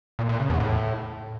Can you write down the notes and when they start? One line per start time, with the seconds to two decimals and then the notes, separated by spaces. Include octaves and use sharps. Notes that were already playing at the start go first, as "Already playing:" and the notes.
0.19 A#2
0.29 A#2
0.39 C#3
0.50 E2
0.60 A2